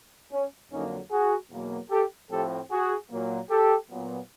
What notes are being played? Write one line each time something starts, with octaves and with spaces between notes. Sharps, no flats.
C#4
F2 D3 F#3 A#3 C#4 D#4
F#4 G#4
E2 B2 F#3 A#3
G4 A4
A2 F3 A3 C4 G4 A4
F#4 G#4
A#2 F#3 A#3
G4 A4
A#2 F#3 B3